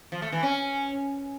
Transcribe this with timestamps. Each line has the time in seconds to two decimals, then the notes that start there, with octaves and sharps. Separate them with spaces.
0.12 F3
0.22 A3
0.32 E3
0.43 C#4